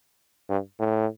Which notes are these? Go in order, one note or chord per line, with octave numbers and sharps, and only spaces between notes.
G2
A2